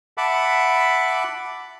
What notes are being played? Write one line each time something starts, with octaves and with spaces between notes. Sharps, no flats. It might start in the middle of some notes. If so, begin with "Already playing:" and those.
E5 F#5 A5 B5 D6